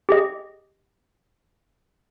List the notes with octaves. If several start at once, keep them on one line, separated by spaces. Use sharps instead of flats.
G4 G#4 D#5